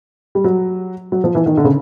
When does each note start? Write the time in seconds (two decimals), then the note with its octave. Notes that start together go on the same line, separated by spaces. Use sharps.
0.35 G3
0.44 F#3
1.12 F#3
1.24 F3
1.35 E3
1.46 D#3
1.57 D3
1.64 C#3